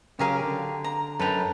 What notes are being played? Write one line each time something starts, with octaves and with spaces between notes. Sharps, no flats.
C#3 F#3 G4 G#4 A#4 F5
D3
A#5
F#2 A4 B4 G5 A#5